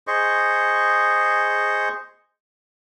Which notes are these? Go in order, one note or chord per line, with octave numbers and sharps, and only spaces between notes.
G#4 C5 D#5 C#6